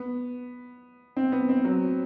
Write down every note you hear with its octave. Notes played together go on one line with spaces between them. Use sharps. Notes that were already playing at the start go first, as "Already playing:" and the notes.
Already playing: B3
C4
B3
C4
F#3